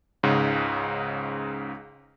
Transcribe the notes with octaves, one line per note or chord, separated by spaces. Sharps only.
C#2 G#2 C#3